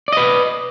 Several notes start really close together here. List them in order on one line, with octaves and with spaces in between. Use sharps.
D5 D#5 B4